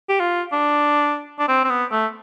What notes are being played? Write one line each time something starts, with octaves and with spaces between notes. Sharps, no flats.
G4
F4
D4
D4
C4
C4
B3
A3